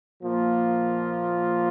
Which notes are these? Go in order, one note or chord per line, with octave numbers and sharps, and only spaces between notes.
A#2 F3 A#3 F4